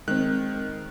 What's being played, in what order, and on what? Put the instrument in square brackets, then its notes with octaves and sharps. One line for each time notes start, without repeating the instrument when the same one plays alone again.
[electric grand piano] D#3 F#6 [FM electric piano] G#3 C4